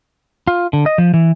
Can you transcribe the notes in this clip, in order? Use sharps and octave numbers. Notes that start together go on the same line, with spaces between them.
F4
D3
D#5
F3
E3